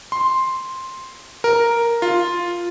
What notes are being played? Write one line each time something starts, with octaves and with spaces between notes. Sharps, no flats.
C6
A#4
F4